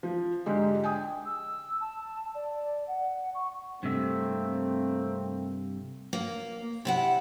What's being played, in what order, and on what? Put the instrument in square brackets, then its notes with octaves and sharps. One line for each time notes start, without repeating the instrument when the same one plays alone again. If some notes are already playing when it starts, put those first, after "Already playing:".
[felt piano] F3
G#2 D3 G#3 D#4 G4
G5 G#5 D#6
[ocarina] E6
A5
D5
F#5
C#6
[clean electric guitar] G2 C3 E5 [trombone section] A3 A#3 C4
[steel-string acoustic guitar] A#3
C3 E4 F#5